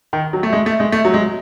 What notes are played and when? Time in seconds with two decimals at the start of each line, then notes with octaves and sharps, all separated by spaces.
0.13 D#3
0.33 F#3
0.43 A3
0.53 G#3
0.66 A3
0.80 G#3
0.92 A3
1.05 F#3
1.14 G#3